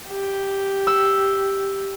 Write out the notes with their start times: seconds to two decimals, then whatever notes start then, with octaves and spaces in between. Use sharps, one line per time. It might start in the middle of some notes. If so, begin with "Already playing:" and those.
0.10 G4
0.87 E6